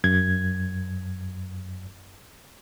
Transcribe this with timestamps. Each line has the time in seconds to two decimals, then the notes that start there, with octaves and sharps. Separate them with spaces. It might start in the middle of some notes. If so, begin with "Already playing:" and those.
0.04 F#2 G#6